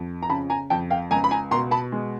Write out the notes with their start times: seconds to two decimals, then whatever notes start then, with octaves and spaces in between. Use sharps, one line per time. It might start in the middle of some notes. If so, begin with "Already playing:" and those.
Already playing: F2
0.23 A#5
0.29 C#3 A5 B5
0.50 G#5 A#5
0.70 F2 G5 A5
0.91 F5 G5
1.11 C#2 G#5 A#5
1.24 B5
1.31 G#5 A#5
1.51 B2 A#5 C6
1.71 A5 B5
1.92 G#3